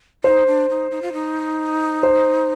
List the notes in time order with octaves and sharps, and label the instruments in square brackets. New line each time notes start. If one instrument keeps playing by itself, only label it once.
[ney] D#4 [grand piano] C5
[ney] D4
D#4
D#4
F4
D#4
[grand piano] C5